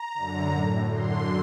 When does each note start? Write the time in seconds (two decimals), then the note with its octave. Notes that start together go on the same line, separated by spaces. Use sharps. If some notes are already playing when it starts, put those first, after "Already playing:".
Already playing: A#5
0.15 F#2 D3
0.53 A2
0.91 F#2 D3 C6